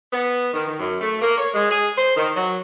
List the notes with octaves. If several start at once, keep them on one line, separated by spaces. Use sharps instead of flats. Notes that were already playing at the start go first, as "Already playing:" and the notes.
B3
D#3
D#3
F#2
A3
A#3
C#5
G#3
G#4
C5
D#3
F#3